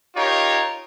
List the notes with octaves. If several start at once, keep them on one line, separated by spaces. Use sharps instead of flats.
D#4 F4 G4 A#4 C#5